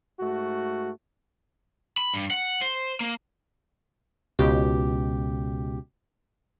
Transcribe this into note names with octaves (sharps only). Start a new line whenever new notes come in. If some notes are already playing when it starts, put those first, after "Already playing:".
G#2 A3 F#4
B5
G2
F#5
C5
A#3
C#2 B2 G4